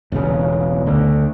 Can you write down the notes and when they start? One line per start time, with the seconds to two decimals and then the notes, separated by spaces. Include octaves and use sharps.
0.12 E1 B1 E2 C#3
0.86 D2 D3